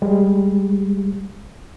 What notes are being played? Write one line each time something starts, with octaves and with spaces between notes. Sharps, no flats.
G3 G#3